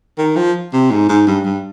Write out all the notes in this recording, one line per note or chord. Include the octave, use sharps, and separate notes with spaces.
D#3
F3
C3
G#2
G#2
G2
G2